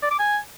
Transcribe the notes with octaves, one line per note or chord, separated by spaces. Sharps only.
D5
D6
G#5